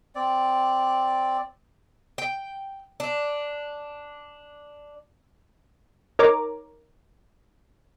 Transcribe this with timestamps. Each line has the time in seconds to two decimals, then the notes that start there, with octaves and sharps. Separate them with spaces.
0.15 C4 D5
2.18 G5
3.00 D4
6.19 D#4 A#4 C#5 A#5 D6